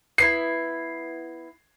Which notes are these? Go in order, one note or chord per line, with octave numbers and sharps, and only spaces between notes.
B3 D4 E4 C7